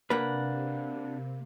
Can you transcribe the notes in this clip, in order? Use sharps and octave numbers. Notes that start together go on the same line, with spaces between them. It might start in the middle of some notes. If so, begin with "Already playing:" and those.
C3 A#3 D4 B4 F#5